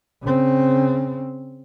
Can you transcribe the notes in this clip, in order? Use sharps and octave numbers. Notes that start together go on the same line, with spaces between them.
C#3 C4